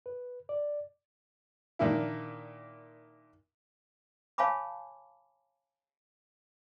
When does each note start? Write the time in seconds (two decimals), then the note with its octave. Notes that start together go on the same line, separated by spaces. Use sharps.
0.06 B4
0.49 D5
1.79 A#2 D#3 A#3 D4 E4
4.38 C#5 F5 G#5 A5 B5 D6